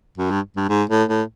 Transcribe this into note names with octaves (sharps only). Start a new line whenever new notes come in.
F#2
G2
G2
G#2
A2
A2